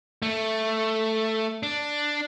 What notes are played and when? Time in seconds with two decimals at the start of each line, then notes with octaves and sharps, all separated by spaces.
0.22 A3
1.63 D4